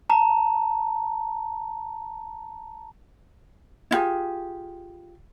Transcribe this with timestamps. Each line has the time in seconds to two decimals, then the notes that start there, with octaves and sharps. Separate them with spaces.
0.10 A5 A#5
3.91 E4 F4 G4 G#4